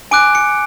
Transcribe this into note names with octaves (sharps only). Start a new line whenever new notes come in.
G#5 D6 F#6 D7
C#7